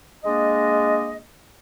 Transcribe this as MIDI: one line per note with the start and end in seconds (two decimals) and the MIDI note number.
0.25 1.18 56
0.25 1.18 58
0.25 1.18 62
0.25 1.18 75